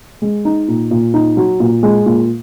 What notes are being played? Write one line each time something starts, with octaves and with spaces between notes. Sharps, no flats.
G#3
D#4
A#2
A#2
D#4
F#3
A#2
G#3
A#2